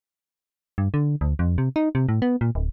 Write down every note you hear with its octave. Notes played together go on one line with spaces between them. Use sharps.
G2
D3
D2
F2
C3
D#4
C3
A2
B3
A#2
D1